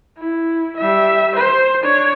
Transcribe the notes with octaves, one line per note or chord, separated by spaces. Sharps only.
E4
G3 E5
C5
D4 C#5